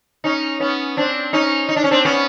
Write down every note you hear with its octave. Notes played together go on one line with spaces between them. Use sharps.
C#4 D#4
B3 C#4
C4 D4
C#4 D#4
D#4
D4
C#4
C4 D4
B3 C#4